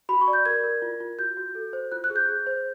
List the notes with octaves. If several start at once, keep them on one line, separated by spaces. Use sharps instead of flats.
F#4 B5
C#6
D5
G6
A#4 G#6
A#4
F4
F4
F#4 G6
F#4
A4
C5
F4 F#6
F#6
G#4
G6
G#4
C5